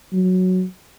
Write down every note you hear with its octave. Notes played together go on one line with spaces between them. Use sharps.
F#3